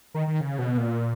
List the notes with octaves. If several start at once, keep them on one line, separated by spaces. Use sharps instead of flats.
D#3
D#3
C#3
B2
A#2